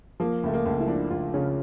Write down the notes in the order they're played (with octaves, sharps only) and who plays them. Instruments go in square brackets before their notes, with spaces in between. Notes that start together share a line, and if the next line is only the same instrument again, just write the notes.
[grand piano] F3 A#3
C#2 A3
A#3
C#2
E4
F3 D4
C#2 F4
C#3 C#4